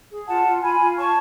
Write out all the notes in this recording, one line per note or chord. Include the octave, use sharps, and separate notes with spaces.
G#4
F4 F#5 A5
F4
F4 G#5 B5
F4
C#5 A5 C#6